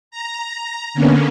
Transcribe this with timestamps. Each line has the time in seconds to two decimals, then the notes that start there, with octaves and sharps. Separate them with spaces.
0.11 A#5
0.94 D3 A#3 B3 C#4